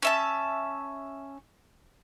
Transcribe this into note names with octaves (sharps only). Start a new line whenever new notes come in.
C#4 E5 A5